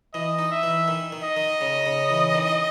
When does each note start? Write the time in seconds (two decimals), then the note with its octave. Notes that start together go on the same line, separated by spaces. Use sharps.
0.14 E3 D#5
0.39 D#4
0.51 E5
0.63 E3
0.88 D#3
1.12 D#3
1.24 D#5
1.37 D#3
1.61 C#3
1.86 C#3
2.10 E3
2.34 D#3